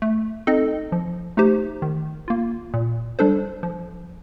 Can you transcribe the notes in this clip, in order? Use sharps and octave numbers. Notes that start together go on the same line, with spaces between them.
A3
C4 D#4 A4 D#5
F3
A3 D#4 G4 C5
D#3
A#3 F4
A#2
G3 D4 A4 C5
F3